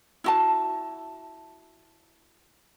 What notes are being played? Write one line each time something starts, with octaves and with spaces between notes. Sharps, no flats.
E4 F#4 A5